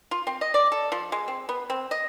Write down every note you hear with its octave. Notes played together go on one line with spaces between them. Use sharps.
F4
C4
D#5
D5
A4
F3
G#3
C4
B3
C4
D#5